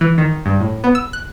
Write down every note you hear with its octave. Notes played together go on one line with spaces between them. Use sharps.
E3
D#3
G2
A2
B3
E6
F#6